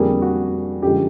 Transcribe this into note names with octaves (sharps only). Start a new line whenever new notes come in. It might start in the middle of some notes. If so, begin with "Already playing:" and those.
Already playing: F2 D3 G3 A#3 G#4
F#4
F#2 D3 F3 G#3 G4